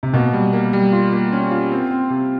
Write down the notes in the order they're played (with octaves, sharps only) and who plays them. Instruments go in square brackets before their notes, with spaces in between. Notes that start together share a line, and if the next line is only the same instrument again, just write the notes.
[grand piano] C3
[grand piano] B2 [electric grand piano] A#3
[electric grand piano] G3
A#3
G3
F4
A#3
C#4
F4
C4
C4
C3